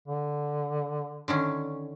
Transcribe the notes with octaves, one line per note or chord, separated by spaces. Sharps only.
D3
D3 D#3 C#4